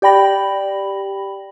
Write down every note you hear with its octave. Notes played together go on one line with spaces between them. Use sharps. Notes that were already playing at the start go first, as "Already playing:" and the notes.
G4 D5 G5 B5 A#6 F#7